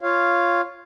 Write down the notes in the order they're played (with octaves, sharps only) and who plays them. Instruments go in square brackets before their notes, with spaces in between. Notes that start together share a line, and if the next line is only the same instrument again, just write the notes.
[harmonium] F4 C#5 F5